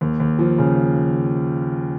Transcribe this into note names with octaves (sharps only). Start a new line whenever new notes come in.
D#2
D#2
F3
C#3